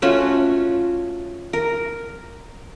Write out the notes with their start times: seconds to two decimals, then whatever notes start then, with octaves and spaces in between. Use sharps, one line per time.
0.02 A3 C#4 F4 F#4
1.53 A#4